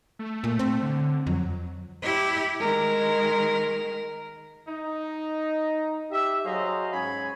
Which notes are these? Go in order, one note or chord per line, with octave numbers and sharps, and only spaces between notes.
A3
A#2
C4
D3
F2 F#3
E4 G4
D#3 G#3 A#4
D#4
G4 E5
F#3 G#4 C5 D#5 F5
G#2 C#4 C#5 G#5 B5